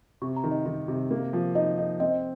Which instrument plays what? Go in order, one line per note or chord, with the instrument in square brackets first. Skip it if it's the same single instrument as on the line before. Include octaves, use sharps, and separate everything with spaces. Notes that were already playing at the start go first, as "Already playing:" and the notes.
[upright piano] C3 [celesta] C#6
[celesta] A#5
[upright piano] D#3
[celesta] D#5
[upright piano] D#3
C3
A#3
F3
[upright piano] D#4 [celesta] D#5
[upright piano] D#4
[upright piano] C4 [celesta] D#5